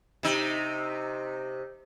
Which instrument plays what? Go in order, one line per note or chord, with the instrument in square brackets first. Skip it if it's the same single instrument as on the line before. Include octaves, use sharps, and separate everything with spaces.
[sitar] C3 D#4